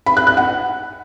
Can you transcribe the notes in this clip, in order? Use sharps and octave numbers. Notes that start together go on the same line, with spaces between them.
B5
F#6
F#6
F#5